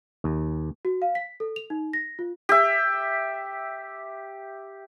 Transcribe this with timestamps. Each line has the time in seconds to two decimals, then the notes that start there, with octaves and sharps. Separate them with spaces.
0.24 D#2
0.85 F#4
1.02 F5
1.15 B6
1.40 A4
1.56 F7
1.70 D#4
1.93 A#6
2.19 F4
2.49 G4 E5